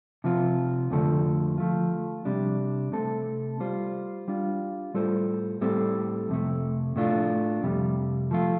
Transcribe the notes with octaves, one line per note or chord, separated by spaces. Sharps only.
C3 F3 C4 F4
F2 D3 F3 A3
F3 A3 F4
C3 G3 D4
C3 A3 C4 A4
G3 F4 C5
G3 D4 F4
A2 G3 F4 A4 C5
A2 G3 C4 A4 C5
F2 C3 A3
A2 A3 D4 F4
F2 C3 G3
F3 A3 F4